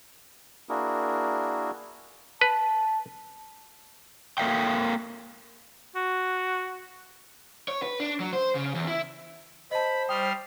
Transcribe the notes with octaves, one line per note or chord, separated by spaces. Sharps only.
A#3 D4 E4 F#4 G#4 A#4
B4 A5
A#3 A4 A#4 E5 F5 G5
F#4
C#5
B4
D4
F#3
C5
C#3
E2
E4
C5 D#5 A5 B5
G3 G5 C6 D#6 F6